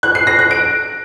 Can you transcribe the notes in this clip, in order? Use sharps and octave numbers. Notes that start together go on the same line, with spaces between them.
F#6
C7
A#6
F#6
D7